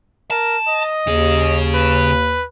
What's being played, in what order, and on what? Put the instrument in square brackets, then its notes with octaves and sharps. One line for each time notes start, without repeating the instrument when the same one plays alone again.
[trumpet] A#4 [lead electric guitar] A5
[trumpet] D#5
[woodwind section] D#2 [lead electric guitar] C#3 G#4
[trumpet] B4